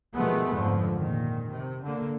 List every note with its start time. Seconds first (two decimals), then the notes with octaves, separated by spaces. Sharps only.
0.15 B2 D#3 F3 G#3 A3 B3
0.53 F2 G#2 D3 F3
0.97 A#2 D#3
1.52 C3
1.84 D3 A#3